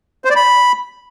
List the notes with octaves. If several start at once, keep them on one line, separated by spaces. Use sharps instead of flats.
C5
D5
B5